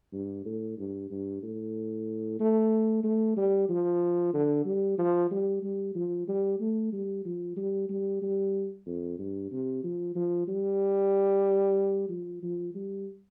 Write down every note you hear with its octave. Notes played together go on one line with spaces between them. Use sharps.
G2
A2
G2
G2
A2
A3
A3
G3
F3
D3
G3
F3
G3
G3
F3
G3
A3
G3
F3
G3
G3
G3
F2
G2
C3
F3
F3
G3
F3
F3
G3